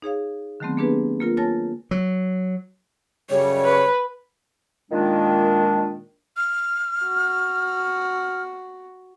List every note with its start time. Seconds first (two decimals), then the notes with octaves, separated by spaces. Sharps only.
0.02 D#4 G#4 C#5 F5
0.60 D3 D#3 F#3 A3 B3 C4
0.77 A#3 B3 D4 G4 G#4 B4
1.20 A#3 F4 A#4
1.37 F4 C#5 G#5 A5 A6 A#6
1.91 F#3
3.30 F#2 C#3 G3 C#5
3.65 B4
4.91 A#2 D#3 G#3 D4
6.37 F6
7.02 F#4